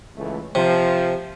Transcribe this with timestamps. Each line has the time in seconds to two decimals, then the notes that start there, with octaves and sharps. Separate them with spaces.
0.17 C#2 E3 A3
0.55 C3 F3